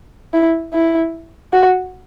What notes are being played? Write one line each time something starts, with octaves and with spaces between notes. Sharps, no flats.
E4
E4
F#4